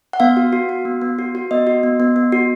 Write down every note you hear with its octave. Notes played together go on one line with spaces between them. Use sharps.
F#5
B3 F5
F#4
F#4
F#4
B3
B3
F#4
F#4
B3 D#5
F#4
B3
B3
B3
F#4